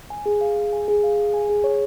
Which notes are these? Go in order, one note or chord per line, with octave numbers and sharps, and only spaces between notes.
G#5
G#4
F5
G#4
G#5
G#4
F5
G#4
G#5
G#4
C#5